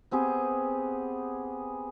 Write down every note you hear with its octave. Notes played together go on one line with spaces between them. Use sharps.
B3 C4 G4 G#4